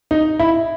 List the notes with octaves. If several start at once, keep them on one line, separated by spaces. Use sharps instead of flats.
D#4
E4